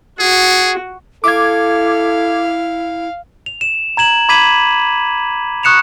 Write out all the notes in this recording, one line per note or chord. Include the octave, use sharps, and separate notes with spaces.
F#4 G#4
E4 A4 F5 D6 G#6
F7
E7
A#5 G#6 E7 F#7
B5 D6 G#6 B6 D#7 F#7
C#6 D#6 F#6 C#7 E7 F7